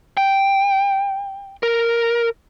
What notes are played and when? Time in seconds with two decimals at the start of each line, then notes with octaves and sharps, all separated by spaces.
0.17 G5
1.63 A#4